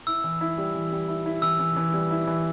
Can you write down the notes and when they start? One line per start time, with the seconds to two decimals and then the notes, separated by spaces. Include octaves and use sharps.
0.07 E4 E6
0.24 E3
0.41 E4
0.58 G3
0.75 E3
0.92 G3
1.08 E4
1.26 E4
1.42 E3 E6
1.59 E3
1.76 E3
1.93 G3
2.11 E4
2.27 E3